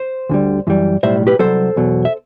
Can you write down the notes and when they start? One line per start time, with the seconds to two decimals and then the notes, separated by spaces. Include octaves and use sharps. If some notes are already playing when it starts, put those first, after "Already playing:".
Already playing: C5
0.29 D2 D3 G3
0.67 F#2 E3 G3
1.03 B1 A2 G3 C5 E5
1.27 G4 B4
1.39 C2 B2 F#3 A4 C5
1.76 E2 B2 F#3
2.05 E5